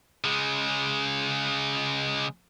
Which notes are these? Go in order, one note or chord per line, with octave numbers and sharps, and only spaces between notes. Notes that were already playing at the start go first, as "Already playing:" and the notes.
C#3 G#3